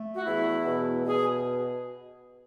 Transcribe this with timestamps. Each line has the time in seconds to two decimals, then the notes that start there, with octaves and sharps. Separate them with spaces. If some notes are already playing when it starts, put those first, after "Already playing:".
Already playing: A3
0.15 F#4
0.25 E2 E4
0.65 B2
1.06 B2 G#4